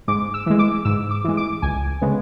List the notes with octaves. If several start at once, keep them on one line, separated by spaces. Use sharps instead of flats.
G#2 D6
E6
E3 G#3
D6
G#2 E6
D6
E3 G#3
D6
C#2 G#5
C#3 G#3 B3